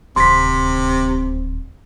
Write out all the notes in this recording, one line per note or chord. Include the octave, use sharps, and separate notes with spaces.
D1 D#2 C3 C4 C6 B6